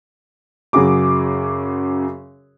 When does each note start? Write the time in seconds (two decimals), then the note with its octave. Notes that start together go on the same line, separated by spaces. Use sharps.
0.73 F#2 C#3 F#4 G#4 D6